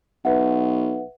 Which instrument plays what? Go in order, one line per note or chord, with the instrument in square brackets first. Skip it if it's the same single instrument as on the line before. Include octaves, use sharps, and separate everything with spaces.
[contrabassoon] B1 [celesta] B4 E5 F#5